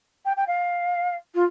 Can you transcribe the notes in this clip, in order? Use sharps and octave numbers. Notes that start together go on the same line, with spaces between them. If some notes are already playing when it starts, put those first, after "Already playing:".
G5
G5
F5
F4